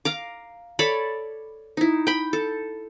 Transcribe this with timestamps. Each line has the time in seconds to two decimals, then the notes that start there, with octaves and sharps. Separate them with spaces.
0.05 F5 A#5 D6
0.79 A4 C#5 D5 B5
1.77 D#4 E4
2.07 G5 B5
2.33 A4